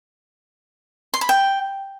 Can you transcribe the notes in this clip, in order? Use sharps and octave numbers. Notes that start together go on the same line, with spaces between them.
C6
B5
G5